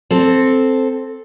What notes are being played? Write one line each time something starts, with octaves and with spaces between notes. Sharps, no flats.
C4 A4